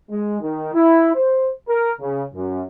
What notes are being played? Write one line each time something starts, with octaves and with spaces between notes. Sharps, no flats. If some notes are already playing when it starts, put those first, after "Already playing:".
G#3
D#3
E4
C5
A#4
C#3
F#2